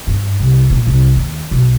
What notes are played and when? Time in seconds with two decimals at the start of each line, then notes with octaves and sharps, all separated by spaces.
0.07 G2
0.40 C2
0.70 A#2
0.87 C2
1.16 D#2
1.51 B1